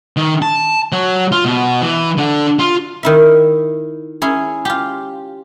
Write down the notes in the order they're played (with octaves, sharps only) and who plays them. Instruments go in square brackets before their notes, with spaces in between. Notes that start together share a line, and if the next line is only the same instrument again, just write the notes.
[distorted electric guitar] D#3
A5
F#3
F4
B2
E3
D3
F4
[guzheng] D#3 E4 E5
C#4 E4 G#4
F4 G4